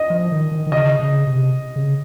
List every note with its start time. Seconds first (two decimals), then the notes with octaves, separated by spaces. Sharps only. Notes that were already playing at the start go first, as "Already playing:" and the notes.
Already playing: D#5
0.10 F3
0.32 D#3
0.52 D#3
0.67 D#3
0.72 C#3 D#5
0.99 C#3
1.27 C3
1.76 C#3